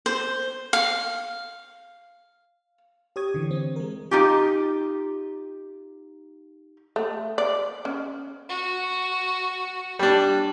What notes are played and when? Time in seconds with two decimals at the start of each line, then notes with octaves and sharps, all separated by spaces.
0.06 C5
0.73 F5
3.16 G4 C#5 D#6 G#6
3.34 D3 E3
3.51 C4
3.76 G#3 A#4
4.11 D#4 F4 G4
6.96 A3
7.38 D5
7.85 C#4
8.50 F#4
9.99 G3 D4